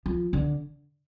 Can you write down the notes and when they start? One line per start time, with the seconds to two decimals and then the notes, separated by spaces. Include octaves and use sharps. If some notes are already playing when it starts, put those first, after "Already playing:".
0.06 F3
0.33 D3